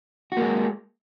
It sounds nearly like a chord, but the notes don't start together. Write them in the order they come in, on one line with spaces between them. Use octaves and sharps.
F#4 A#3 G#3